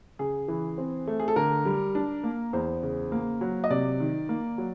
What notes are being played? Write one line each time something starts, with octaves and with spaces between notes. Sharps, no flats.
C#3 G#4
E3
C4
A3
G#4
A4
D3 A#4
G3
D4
A#3
E2 C5
C#3
A#3
F#3
D#5
C3 D5
D#3
A#3
F#3